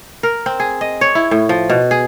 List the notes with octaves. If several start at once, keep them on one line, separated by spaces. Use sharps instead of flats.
A#4
C4
G#4
D#5
C#5
E4
A2
F3
B2
G#4